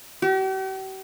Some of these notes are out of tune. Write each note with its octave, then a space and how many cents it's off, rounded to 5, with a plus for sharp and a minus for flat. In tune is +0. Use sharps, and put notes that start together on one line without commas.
G4 -45